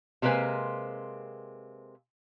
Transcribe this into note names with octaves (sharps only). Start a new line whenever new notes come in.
C3 G#3 A#3 C4 B4 G#5